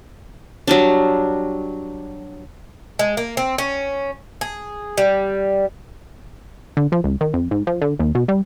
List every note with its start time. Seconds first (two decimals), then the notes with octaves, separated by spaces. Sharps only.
0.67 F#3 G3 D4
2.99 G#3
3.17 A#3
3.37 C4
3.58 C#4
4.41 G#4
4.98 G3
6.77 D3
6.92 F3
7.04 C#2
7.21 D#3
7.34 F2
7.51 G#2
7.67 F3
7.81 D3
7.99 D#2
8.15 B2
8.28 G3